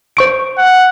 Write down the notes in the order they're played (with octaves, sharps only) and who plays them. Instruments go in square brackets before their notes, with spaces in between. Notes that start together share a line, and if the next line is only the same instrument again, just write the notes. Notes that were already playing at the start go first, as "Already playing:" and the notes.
[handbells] C5 C#6 D7
[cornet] F#5